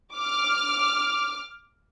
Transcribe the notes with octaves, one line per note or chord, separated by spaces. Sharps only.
D6 F6